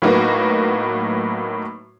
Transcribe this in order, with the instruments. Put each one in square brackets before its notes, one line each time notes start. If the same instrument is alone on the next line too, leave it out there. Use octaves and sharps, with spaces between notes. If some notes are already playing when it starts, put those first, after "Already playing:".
[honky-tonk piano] A2 F#3 A#3 B3 D#4 F#4